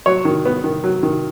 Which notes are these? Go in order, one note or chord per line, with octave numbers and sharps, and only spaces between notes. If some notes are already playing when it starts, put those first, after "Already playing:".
F#3 C#5
D#3
B3
D#3
F#3
D#3